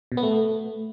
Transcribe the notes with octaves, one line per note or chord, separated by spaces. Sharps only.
B2
B3
A3